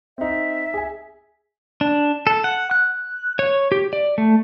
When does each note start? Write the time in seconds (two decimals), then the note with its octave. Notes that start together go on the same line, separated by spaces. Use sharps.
0.18 C4 D#4 E5
0.74 G#4 G#5
1.81 D4
2.27 A4
2.44 F#5
2.71 F#6
3.39 C#5
3.72 G4
3.93 D5
4.18 A3